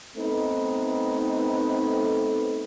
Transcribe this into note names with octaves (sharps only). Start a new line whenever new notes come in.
A3 B3 C4 D#4 A4 B4